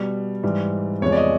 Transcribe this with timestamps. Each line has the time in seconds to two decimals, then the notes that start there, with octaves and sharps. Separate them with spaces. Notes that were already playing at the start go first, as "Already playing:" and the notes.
Already playing: B2 G3
0.43 G#2 E3 G3
1.02 E2 C3 F3 G#3 C#5
1.12 D5
1.17 D#5